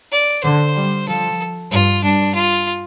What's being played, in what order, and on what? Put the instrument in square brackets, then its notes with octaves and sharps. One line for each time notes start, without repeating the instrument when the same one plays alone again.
[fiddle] D5
[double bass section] D3 [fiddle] C5
[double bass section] G3
[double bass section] F3 [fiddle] A4
[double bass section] G2 [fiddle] F4
[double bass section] G2 [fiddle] D4
[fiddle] F4